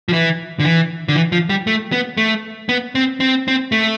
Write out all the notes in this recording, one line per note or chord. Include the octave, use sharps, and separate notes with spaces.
F3
E3
D3
E3
D3
E3
F3
G3
A3
B3
A3
B3
C4
C4
C4
A3